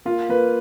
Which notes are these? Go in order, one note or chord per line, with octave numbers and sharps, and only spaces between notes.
A#3 F4
A#3 B4